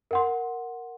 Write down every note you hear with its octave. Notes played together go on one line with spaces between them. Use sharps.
A#4 F#5 C6